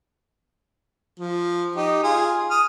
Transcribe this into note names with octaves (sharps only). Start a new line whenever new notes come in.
F3
D#4 G4
F4 G#4
D#6 F6